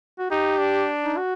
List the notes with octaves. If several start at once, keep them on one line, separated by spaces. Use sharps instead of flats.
F#4
D#4 G4
D4
D#4
F#4